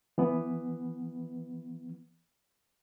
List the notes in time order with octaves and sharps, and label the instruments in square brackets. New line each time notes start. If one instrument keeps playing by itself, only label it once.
[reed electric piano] E3 B3